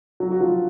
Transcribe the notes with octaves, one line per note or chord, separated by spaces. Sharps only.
F#3 F#4
F#4
F3 F4